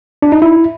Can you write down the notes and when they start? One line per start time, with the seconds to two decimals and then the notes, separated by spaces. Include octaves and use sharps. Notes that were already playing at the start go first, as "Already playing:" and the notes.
0.22 D4
0.32 D#4
0.42 E4